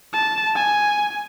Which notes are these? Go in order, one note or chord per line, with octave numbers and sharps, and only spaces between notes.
A5
G#5